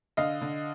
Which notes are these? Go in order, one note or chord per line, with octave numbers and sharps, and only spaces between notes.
D3 D#5 F5
D3